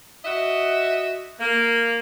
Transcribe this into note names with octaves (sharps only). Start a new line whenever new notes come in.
F#4 D#5 E5
A#3